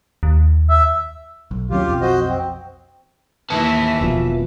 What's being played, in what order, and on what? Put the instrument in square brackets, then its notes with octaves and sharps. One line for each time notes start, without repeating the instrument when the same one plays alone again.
[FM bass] D#2
[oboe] E5
[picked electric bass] B1
[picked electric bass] D#2 F#3 C#4 [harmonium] F4 G4
[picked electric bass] B1 F2
[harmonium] F#4 C5 D#5
C4
[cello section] D#2 E3 E5 [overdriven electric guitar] B4 A5
[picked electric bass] E1 B2 F3